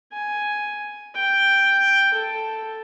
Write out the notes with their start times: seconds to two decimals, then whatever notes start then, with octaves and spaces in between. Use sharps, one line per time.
0.12 G#5
1.15 G5
2.14 A4